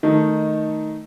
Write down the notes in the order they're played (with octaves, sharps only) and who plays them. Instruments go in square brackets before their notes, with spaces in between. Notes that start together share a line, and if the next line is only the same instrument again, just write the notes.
[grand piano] D#3 A3 D#4